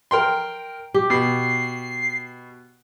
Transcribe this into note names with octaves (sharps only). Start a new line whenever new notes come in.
A#4 G5 C6
G4
B2 C7